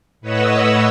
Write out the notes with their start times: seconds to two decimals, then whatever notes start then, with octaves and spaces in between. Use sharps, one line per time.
0.21 A2 B4 C#5 D#5 F#5 E6